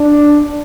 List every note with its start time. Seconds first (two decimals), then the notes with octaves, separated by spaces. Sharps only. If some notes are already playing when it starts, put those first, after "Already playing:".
Already playing: D4